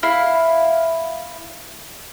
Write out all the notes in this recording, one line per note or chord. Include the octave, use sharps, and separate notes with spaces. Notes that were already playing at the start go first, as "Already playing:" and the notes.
E4 F5